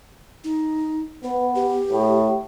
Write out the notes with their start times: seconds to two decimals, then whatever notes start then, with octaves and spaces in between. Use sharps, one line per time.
0.44 D#4
1.24 B3 B4
1.55 G4
1.91 A2